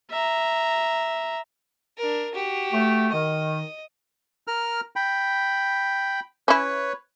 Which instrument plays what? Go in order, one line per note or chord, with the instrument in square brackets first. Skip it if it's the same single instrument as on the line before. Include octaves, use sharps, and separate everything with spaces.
[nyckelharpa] E5 A#5
[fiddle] D4 A#4
F#4 G4
[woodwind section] A3
[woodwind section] D#3 [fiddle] D#5
[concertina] A#4 F6
G5 B5
[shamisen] C#4 E4 [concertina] B4 C#5